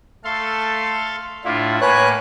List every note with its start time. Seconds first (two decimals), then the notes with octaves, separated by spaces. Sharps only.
0.24 A3 A4 F5 C6
1.45 A2 D4 E4 F4
1.81 A2 A#3 B4 C#5 G#5 F#6